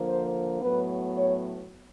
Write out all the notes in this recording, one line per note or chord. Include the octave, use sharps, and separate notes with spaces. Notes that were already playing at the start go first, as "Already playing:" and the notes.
Already playing: D3 F3 A#3
C5
A2 F#3 B3 B4
C#5